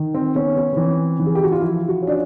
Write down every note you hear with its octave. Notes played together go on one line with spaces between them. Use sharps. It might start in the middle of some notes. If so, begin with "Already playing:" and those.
Already playing: D#3
C4
B3 C#4
B3
B3
E3 C4
E3
G#4
G4
F#4
F4
F3 E4
F#4
C#4
D4